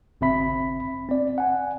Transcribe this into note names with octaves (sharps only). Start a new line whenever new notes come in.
G#1 C#3 C4 E5 B5 B6
C4 D5
F#5 G#5